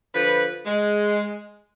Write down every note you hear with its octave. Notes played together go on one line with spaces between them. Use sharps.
D3 F3 B4
G#3